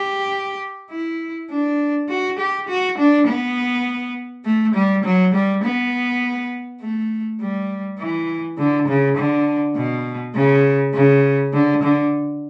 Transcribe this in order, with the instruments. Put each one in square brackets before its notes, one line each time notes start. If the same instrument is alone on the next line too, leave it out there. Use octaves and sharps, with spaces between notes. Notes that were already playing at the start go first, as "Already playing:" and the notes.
Already playing: [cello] G4
E4
D4
F#4
G4
F#4
D4
B3
A3
G3
F#3
G3
B3
A3
G3
E3
D3
C#3
D3
B2
C#3
C#3
D3
D3